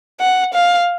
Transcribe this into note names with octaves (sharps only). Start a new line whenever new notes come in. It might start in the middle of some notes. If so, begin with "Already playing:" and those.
F#5
F5